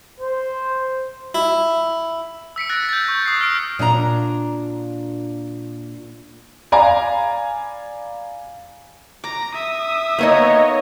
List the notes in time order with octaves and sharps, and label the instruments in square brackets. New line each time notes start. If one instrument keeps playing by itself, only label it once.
[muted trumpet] C5
[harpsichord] E4
[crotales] E6 B6 C#7 D7
F#6 A6 A#6
G6 A6
C#6
D#6 C7
F6 D7
[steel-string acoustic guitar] A#2 D4 D5 A#5
[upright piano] D5 F5 G#5 A#5 B5
[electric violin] A#5 [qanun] D6
[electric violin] E5 D#6
[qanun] A#3 B3 D#4 [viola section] C#5 D#5